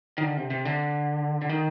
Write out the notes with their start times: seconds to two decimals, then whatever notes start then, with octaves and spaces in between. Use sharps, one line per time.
0.18 D#3
0.23 D3
0.37 C3
0.50 C3
0.65 D3
1.42 D3
1.49 D#3